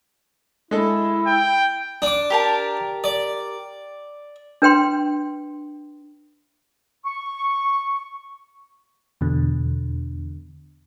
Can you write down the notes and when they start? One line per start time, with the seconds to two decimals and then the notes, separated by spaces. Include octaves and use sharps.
0.71 G#3 E4 A4
1.27 G5
2.02 D4 D6
2.30 G4 A#4 A5
3.04 D5
4.62 D4 B4 G5 C6
7.05 C#6
9.21 E2 B2 D3